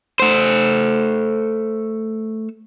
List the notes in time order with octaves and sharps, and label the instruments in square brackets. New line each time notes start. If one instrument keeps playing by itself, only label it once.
[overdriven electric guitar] A3 C5